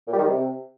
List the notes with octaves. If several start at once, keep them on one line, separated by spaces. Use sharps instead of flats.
A#2
G3
D#3
G3
C3